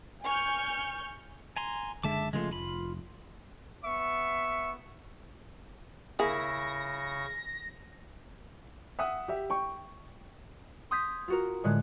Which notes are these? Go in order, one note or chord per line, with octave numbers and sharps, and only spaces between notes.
G#5 C#6 F6 G6
G#5 A#5 C6
F#1 D3 G#3 E5 A5 D6
C#3 F3 G#3 A3 F4
F1 F4 B5
B3 E5 C#6
C#3 A#3 E4 G#4 C#6 A#6
E5 F#5 D#6
G4 E5
G5 C#6
C6 D#6 F6 G6 G#6 B6
F4 F#4 A#4
A2 D3 G#3 F#6